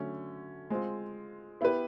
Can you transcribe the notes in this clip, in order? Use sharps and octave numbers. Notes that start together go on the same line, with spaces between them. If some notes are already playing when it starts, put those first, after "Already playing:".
Already playing: D3 F#3 A3 C#4
G#3 C4 F4
B3 E4 G4 B4